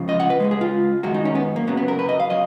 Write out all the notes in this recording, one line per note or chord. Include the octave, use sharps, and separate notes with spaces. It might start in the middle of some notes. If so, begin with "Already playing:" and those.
Already playing: C#2 C#3 F3
D#5
F#5
B4
C#2 B2 G#3
G#4
F4
F#2 D#3 G#3 F#4
D#4
C#4
B3
A#3
F#2 C#3 F#3 B3
B3
A#4
B4
D#5
F5
F#3 D#5